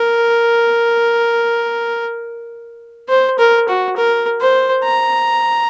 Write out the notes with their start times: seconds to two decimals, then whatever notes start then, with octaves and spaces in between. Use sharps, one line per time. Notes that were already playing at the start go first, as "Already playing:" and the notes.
Already playing: A#4
3.09 C5
3.39 A#4
3.68 F#4
3.97 A#4
4.41 C5
4.84 A#5